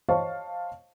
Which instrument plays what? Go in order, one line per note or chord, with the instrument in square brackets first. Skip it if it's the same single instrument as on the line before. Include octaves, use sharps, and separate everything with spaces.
[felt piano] C5 C#5 D#5 F5 A5 C#6